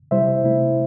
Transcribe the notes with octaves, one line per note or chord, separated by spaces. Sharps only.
C3 G3 E4 C5 E5
C3 A3 E4